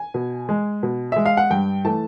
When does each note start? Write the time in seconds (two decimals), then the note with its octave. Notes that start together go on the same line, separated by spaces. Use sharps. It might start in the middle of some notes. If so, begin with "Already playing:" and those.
Already playing: G#5
0.14 B2
0.49 G#3
0.83 B2
1.12 G#3 E5
1.25 F5
1.37 F#5
1.50 G2 G5
1.85 E3 A3 A5